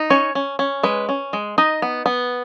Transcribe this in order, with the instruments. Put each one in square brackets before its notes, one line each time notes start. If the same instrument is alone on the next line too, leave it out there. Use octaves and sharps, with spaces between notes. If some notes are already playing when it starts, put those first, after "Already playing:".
Already playing: [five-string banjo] D#4
C#4 C#5
C#4
C#4
G#3 B4
C#4
G#3
D#4 D#5
B3
B3